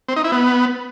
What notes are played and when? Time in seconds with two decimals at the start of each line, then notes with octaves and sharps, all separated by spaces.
0.08 C4
0.16 D#4
0.24 E4
0.32 B3